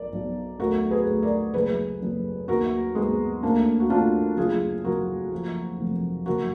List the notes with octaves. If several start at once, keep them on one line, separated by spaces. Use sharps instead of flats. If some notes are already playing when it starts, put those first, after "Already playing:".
Already playing: B1 A#4 D5
B1
D2 F#4 A#4
G#4 B4
D2
A#4 D5
F#1 G#4 B4
F#1
D#2 F#4 A#4
D#2 G#3 B3
D2 A#3 D4
F#4
D2 D4 F4
F#1 F4 G#4
F#1 F#4 A#4
F3
F1
F#1 F#4 A#4